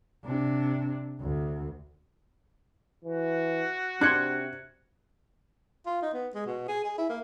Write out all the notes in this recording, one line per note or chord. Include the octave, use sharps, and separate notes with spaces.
C3 D4
D2
E3 F#4
C3 D4 D5 C6 F#6 G#6 C#7
F4
D#4
B3
G#3
B2
G#4
G#4
E4
A#3